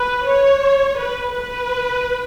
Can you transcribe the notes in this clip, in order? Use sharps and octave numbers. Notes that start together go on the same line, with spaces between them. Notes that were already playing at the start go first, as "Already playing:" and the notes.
Already playing: B4
C#5
B4
B4